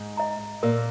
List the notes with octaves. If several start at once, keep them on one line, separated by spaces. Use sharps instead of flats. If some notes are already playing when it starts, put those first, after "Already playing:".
Already playing: G#2
D#5 A#5
A#2 A#4